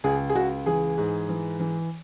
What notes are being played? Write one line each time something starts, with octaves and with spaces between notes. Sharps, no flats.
C#2 G#4
G#4
C#2 F#4
E3 G#4
G#2
E3
E3